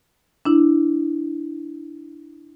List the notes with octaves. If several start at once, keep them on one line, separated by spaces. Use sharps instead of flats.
D4 E4